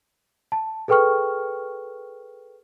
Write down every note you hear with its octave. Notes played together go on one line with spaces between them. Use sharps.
A5
G#4 A4 B4 G5 C#6 F6